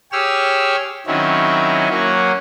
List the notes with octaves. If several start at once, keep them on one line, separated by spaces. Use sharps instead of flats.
G4 G#4 C#5 E6 F6
D#3 F#3 C4 C#4 E4
F#3 A#3 C#4 F#4